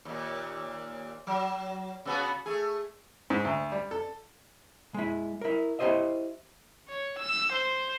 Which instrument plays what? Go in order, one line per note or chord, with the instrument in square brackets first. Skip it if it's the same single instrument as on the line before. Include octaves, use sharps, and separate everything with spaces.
[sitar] D#2 A#2
F#3
C#3 B3 F#4
A3 G#4
[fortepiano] G#2
D2
G3
A4
[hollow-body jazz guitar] G#3 E4
E4 A#4
E4 G4 G#4 C5 D#5 E5
[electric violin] C#5
E6
C5